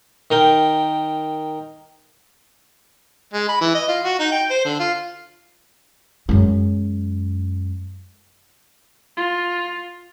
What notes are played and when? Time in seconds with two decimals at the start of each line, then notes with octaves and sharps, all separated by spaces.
0.31 D#3 A#4 G5
3.33 G#3
3.49 B5
3.61 E3
3.74 D#5
3.88 F4
4.04 F#4
4.19 D#4
4.32 G5
4.50 C5
4.65 D3
4.80 F4
6.29 F#2 G#3
9.17 F4